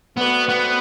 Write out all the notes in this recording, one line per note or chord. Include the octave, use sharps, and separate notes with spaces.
A3 B3 C4 F#4 B4 D5
B3